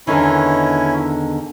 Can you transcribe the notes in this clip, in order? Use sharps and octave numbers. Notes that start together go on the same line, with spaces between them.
E2 D3 D#3 C#4 E4